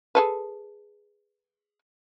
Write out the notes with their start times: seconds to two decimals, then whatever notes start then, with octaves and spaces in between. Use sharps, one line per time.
0.15 G#4 A4 B4